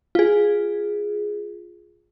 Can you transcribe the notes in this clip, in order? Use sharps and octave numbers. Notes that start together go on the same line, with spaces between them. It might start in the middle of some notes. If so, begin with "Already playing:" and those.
F4 G#4